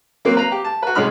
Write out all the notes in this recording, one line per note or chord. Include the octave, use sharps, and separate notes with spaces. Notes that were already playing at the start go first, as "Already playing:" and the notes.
F#3 A#3 C4
B4 F5 A#5
G4
A5
F#4 B4
C2 G#3 C#4 D#4 B5 F6